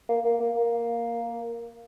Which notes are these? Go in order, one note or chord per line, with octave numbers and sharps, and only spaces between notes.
A#3
A#3
A#3
A#3